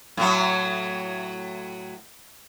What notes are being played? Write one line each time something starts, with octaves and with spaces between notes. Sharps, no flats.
A2 F#3